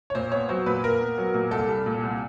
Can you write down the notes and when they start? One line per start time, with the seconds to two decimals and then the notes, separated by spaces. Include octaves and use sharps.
0.10 C#5
0.15 A#2 C5
0.32 B3 C#5
0.49 F#3 C5
0.66 A#2 B4
0.83 A#2 A#4
1.01 B3
1.18 F#3
1.34 A#2
1.51 C2 A4
1.68 G3
1.86 A#2
2.03 C2